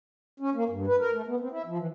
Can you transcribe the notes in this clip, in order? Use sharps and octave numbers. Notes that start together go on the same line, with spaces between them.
C#4
A#3
G2
B4
A#4
A3
B3
C4
E4
F3
E3